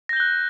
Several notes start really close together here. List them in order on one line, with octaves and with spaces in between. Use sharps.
A#6 G6 G7 F#6